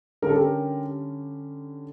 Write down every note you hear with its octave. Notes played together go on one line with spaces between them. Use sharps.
D3 G3 C#4 A#4
A4
G4 A#4